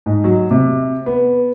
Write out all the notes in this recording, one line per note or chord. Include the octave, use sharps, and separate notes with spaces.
G#2
F#3
C3
B3